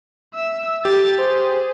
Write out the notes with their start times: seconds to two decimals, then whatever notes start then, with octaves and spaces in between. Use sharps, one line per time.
0.34 E5 E6
0.85 G4 A4 A6
1.19 G#4 C5